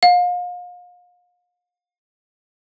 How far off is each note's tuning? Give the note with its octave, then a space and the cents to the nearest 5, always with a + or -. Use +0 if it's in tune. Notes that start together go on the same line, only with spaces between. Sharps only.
F5 +35